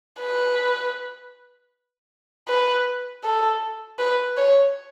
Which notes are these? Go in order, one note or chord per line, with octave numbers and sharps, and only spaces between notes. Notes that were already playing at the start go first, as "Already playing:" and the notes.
B4
B4
A4
B4
C#5